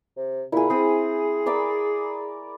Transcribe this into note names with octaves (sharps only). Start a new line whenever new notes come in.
C3
A#2 E4 G#4
C4 G#4 D#6
A#4 D5 B5